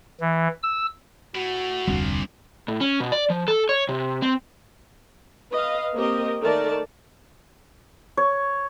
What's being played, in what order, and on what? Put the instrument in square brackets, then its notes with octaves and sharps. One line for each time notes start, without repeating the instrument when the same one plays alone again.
[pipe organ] E3
E6
[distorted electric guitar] A2 A3 [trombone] F#4
[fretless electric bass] F1 D2 [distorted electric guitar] A#2 F3 [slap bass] G3 C4 D4
[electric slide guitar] A2
C#4
B2
D5
F3
A4
C#5
C3
C4
[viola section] B4 D#5 F5
A#3 C4 G4 A#4 D#5
D#3 A3 A4 A#4 D5 A5
[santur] C#5